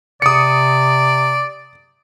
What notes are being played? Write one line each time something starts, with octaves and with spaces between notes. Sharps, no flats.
C3 D5 D#6 C#7